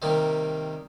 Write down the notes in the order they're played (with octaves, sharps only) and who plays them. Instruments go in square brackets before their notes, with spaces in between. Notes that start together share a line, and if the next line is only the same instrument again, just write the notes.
[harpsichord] C3 D#3 G3 A#3